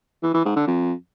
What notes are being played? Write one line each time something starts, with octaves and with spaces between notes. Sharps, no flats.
E3
E3
G#2
D3
F2